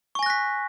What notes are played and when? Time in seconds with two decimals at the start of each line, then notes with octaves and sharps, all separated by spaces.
0.15 C#6
0.19 G#5
0.23 A#6
0.26 F#6
0.30 B6